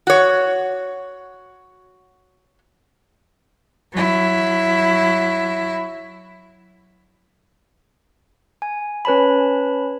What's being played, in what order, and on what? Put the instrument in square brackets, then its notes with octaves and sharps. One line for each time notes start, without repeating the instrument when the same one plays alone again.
[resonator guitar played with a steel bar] F#4 C#5
[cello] F#3 E4
[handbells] G#5
C#4 B4 C#5 A5 B5